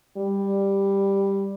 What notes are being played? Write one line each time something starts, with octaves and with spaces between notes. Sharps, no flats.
G3